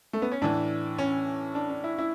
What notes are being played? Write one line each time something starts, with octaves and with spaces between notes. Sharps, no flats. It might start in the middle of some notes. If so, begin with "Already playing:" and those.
A3
B3
C#4
A2 E3 D4
C#4
D4
D4
E4
E4